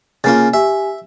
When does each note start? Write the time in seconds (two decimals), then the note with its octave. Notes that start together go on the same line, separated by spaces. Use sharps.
0.24 C#3 A#3 F4 G#5 A6
0.53 G4 E5 G#5